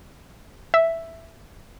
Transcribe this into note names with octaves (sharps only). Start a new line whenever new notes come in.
E5